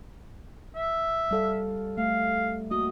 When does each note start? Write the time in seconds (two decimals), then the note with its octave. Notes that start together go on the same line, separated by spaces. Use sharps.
0.76 E5
1.31 G3 A4 F5
1.98 A3 F5
2.71 A#3 F#4 D#5